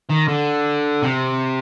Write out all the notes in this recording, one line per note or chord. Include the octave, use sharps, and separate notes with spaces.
D#3
D3
C3